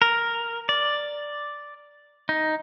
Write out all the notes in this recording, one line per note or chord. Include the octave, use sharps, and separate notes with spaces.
A#4
D5
D#4